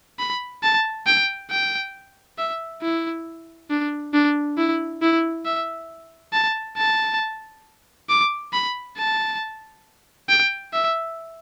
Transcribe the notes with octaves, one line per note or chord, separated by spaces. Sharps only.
B5
A5
G5
G5
E5
E4
D4
D4
E4
E4
E5
A5
A5
D6
B5
A5
G5
E5